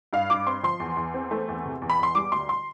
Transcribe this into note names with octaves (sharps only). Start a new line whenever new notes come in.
G2 F5
G2 D6
C4 C6
F3 C6
E2
E2
C4
A3
E2
C3
E2
B5
E2 C6
G3 D6
D2 C6
C6